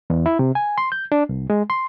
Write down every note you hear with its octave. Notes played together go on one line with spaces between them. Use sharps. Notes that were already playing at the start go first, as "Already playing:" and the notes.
E2
E4
C3
G#5
C6
G6
D4
C2
G#3
C6